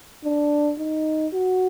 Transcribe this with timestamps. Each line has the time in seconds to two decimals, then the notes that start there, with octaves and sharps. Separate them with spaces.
0.24 D4
0.79 D#4
1.33 F#4